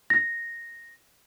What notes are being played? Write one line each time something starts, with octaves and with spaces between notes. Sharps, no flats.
A#6